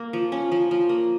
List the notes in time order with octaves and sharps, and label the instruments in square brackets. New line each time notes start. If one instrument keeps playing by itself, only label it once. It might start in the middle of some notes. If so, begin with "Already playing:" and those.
Already playing: [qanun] A#3
F3
C#4
F3
F3
A#3